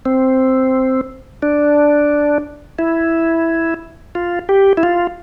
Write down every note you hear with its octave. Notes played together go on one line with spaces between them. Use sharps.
C4
D4
E4
F4
G4
E4
F4